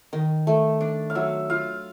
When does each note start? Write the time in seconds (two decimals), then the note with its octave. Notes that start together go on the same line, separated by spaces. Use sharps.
0.13 D#3
0.47 A3
0.81 D4
1.10 F5
1.15 F#3 E5
1.50 F4 F5